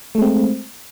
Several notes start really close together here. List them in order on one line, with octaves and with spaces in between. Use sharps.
A3 G#3 C4